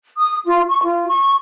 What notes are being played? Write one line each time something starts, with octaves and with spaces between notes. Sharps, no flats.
D#6
F4
C#6
F4
C#6